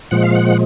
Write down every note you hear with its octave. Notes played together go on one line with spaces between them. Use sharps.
A#2 F3 G#3 F#5
F5
F#5